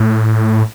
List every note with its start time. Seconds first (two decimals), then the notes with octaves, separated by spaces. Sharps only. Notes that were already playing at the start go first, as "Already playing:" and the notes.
Already playing: A2